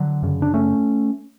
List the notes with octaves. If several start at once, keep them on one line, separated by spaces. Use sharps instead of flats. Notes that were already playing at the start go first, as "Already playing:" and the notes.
Already playing: D3 F#3
F#2 C#3
D4
A3 C#4